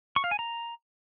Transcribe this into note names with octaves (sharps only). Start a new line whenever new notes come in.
C#6
F5
G#5
A#5